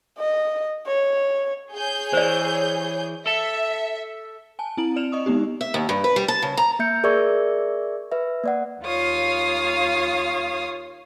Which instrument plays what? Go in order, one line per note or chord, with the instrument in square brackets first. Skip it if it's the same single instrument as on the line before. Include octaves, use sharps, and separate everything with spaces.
[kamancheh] D#5
C#5
[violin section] G#4 C#5 G6
[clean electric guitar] E3 [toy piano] C5 D5
[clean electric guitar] A4 A5 [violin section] E5
[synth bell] G#5 A5
C4 E4 A#5 D7 F#7
D5 F6 E7 F7
D#5 C#6 D#6
G#3 B3 D#4 G4
[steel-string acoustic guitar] E5
D#2
G2
B4
G3
A5
C#3
A#5
[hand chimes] A#3 E5 G6 C#7
G#4 A#4 D5 E5 C#6 G#6
B4 E5
A#3 D5 F#5
[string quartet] D#2 F4 C#5 F5 D#6